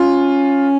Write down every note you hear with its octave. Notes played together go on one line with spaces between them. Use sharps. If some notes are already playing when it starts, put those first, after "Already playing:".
Already playing: C#4 F4